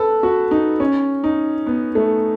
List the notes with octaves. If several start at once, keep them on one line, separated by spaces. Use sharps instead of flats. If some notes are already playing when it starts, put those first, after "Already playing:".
Already playing: A4 B4
F#4
D#4
C#4
D#4
B3
A3